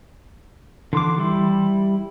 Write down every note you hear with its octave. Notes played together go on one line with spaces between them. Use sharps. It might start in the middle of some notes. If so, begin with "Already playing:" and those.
D3 E3 C6 D6
G3 E4